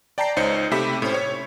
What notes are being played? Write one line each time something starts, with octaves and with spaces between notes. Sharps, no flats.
D5 G5 A5 A#5 C7
C#2 D#4 C5 C#5 C#7
C3 A3 G4 E5 B5 B6
A2 C#4 C5
C#5